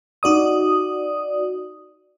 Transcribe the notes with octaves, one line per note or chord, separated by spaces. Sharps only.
D#4 F#4 D5 D#6